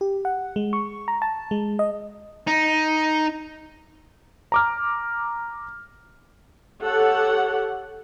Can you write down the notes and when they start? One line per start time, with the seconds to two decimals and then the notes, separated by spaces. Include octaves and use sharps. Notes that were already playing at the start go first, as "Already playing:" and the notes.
0.01 G4
0.25 F#5
0.56 G#3
0.73 C#6
1.08 A#5
1.22 A5
1.51 G#3
1.79 D#5
2.47 D#4
4.52 A#5 D6 F6
6.82 G4 A4 C#5 F#5